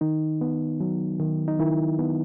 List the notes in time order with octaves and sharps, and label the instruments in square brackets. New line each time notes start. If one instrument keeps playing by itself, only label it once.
[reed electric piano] D#3 D#4
B3
F#3
D#3
D#4
D#3 E4
B3